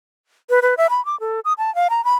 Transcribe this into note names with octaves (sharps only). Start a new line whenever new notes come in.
B4
B4
E5
B5
D6
A4
D#6
A5
F5
A#5
B5